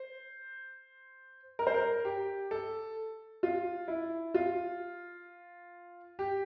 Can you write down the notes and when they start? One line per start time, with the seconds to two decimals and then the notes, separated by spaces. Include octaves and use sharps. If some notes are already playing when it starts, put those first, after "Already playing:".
Already playing: C5
1.59 A#4
1.67 C5
1.74 A#4
2.05 G4
2.51 A4
3.43 F4
3.88 E4
4.34 F4
6.19 G4